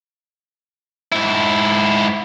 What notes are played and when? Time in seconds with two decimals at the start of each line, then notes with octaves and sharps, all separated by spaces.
1.12 G#2 E4